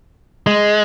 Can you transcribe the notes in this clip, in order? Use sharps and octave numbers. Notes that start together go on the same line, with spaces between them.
G#3